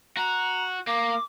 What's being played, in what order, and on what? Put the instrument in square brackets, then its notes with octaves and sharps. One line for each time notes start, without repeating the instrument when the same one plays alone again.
[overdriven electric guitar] F#4 [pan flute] A#5
[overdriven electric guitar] A#3 [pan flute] D6